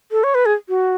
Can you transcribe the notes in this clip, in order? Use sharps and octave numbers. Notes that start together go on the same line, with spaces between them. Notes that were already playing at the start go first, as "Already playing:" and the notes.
A4
C#5
B4
G#4
F#4